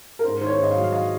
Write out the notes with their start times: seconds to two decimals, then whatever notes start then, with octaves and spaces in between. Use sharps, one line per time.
0.19 A#4
0.24 G#2 C5
0.41 D#3 C5
0.46 C#5
0.59 G#2 D#5
0.70 F5
0.76 F#3
0.84 F5
0.93 D#5